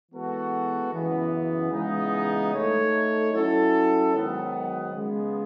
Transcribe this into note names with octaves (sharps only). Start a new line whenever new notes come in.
E3 G#3 B3 F#4 A4
F#2 C#3 E3 B3
C#3 E3 G#3 B3 D#4
A3 D#4 A4 C#5
F#3 C#4 E4 A4
G#2 D#3 F#3 B3
C#3 G#3 B3